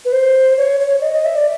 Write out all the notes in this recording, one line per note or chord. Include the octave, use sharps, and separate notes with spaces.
B4
C5
C#5
C#5
D#5
D#5
E5
D5